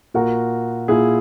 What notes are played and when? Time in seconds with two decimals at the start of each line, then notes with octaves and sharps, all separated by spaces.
0.14 A#2 F#4 A#4
0.88 A#2 E4 G#4